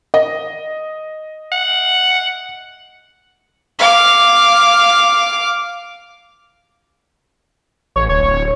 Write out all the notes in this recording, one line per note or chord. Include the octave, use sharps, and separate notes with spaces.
D#5
F#5
F5 D6
A1 C#5
D1 C#5